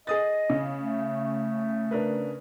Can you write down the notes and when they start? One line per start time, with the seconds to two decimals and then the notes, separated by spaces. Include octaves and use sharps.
0.07 G#4 D#5 D#6 A6
0.50 C#3
0.80 A3
1.91 D4 A#4 B4